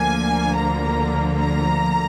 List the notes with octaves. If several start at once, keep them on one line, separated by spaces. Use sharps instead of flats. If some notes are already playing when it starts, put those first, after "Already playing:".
Already playing: D2 D3 F3 A#3 G#5
A#5
A#5